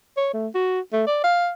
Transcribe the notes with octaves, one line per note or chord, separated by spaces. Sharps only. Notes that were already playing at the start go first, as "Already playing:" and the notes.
C#5
A3
F#4
A3
D5
F5